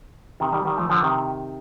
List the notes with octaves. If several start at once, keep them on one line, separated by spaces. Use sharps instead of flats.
C3 D#3
D#3 G3
D#3 G3
F3 A3
D3 F3
C3 D#3